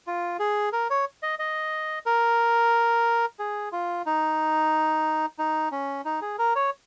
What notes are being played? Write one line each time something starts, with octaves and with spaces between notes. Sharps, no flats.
F4
G#4
A#4
C#5
D#5
D#5
A#4
G#4
F4
D#4
D#4
C#4
D#4
G#4
A#4
C#5